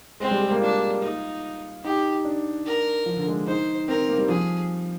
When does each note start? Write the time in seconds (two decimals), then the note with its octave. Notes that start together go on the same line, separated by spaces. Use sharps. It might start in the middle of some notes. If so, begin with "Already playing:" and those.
0.20 G#3 C4
0.31 G3
0.41 G#3
0.51 A#3
0.61 D4 F4
1.02 D#4
1.84 D#4 G4
2.25 D4
2.66 A#4
3.06 F3
3.17 D3
3.27 G#3
3.47 D#4 C5
3.88 C4 A#4
4.08 A#3
4.18 G3
4.29 F3 G#4